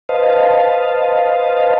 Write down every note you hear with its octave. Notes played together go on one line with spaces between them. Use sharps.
B4 C5 D#5 F5 A5